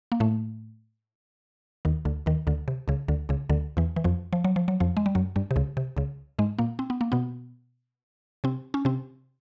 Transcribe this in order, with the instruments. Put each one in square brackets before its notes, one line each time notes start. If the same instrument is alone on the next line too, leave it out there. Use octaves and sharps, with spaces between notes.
[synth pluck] A#3
A2 A3
D#2 D#3
D2 D3
D#2 D#3
D2 D3
C3
C#2 C#3
D2 D3
C#2 C#3
D2 D3
E2 E3
E3
F2 F3
F3
F#3
F3
F#3
F2 F3
G#3
G3
F#2 F#3
G2 G3
C3
C#2 C#3
C3
C#2 C#3
G#2 G#3
A#2 A#3
C4
B3
A#3
B2 B3
C3 C4
C#4
C3 C4